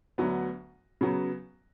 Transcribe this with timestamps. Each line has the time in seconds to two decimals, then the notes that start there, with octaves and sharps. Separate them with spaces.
0.18 D2 D3 F#3 B3
1.01 C#3 F#3 B3